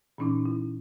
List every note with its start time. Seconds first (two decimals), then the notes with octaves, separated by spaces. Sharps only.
0.18 A#2 E3 C#4 D#4 D6
0.45 E4